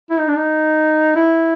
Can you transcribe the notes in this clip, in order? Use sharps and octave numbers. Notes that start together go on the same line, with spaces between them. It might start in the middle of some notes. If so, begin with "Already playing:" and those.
E4
D#4
D4
D#4
E4